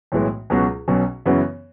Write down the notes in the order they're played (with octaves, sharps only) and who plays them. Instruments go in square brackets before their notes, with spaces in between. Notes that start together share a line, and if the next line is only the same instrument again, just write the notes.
[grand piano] B1 A2 E3 G#3
C#2 B2 F#3 C#4 F#4
B1 B2 F#3 C#4
F#2 C#3 E3 B3 F#4